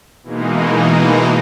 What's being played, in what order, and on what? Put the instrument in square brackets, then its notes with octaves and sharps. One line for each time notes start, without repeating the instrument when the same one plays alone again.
[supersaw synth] B2 E3 G#3 A#3 D#4